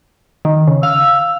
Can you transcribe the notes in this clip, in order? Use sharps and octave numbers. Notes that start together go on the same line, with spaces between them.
D#3
C#3
F5 E6